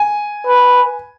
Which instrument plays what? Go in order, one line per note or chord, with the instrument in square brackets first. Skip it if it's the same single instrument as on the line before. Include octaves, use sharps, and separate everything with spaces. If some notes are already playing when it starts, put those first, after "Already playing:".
Already playing: [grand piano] G#5
[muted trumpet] B4